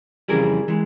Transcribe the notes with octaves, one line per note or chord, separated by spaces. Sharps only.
F2 C#3 E3 G3 G#4 A#4
E3 G#3